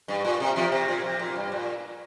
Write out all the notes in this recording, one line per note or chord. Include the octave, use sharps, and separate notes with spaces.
G2
A#2
C3
C3 F3
C3
A#2
C3
A#2
G2
A#2